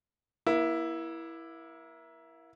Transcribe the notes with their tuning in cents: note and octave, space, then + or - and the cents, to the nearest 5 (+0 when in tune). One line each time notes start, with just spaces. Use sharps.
A#3 +35 E4 +0